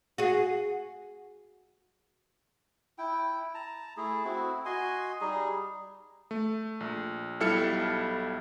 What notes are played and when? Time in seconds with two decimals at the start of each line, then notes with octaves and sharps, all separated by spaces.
0.18 F#4 G#4
2.98 E4 G5
3.54 A5 A#5
3.97 A3 E4 G#4
4.25 C4 E4 F#4
4.65 F#4 D#5 G#5 C6
5.21 G3 D#4 G#4
6.31 A3
6.80 A#1
7.40 B1 G3 E4 A4 F6 C#7